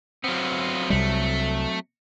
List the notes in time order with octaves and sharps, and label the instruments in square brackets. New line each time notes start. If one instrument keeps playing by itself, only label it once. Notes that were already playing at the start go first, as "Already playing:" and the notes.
[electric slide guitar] F#3 C4 [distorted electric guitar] B3 F4
[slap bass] C2 G3 [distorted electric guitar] A3